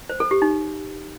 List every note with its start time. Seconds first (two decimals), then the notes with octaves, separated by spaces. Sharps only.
0.10 C5
0.20 A4
0.31 G4
0.42 D#4